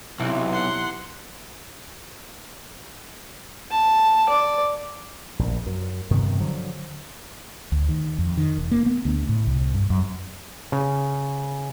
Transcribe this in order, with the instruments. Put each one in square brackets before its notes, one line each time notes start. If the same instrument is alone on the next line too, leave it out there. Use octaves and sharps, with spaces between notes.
[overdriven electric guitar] B1 [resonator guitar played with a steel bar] C3 E3
[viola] F#5 C6
[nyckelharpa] A5
D5
[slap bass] A#1
F#2
G2 C3 D#3 B3
D3 F3 F#3
[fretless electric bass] D2
D#3
F2
D#3
E1
A#3
B3
D2
A2
C2
G2
F#2
[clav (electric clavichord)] C#3